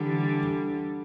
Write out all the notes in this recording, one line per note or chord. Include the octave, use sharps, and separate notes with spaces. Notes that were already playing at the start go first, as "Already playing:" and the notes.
Already playing: D3 E3 G3